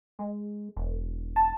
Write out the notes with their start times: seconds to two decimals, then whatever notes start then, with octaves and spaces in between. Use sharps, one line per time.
0.19 G#3
0.77 E1
1.36 A5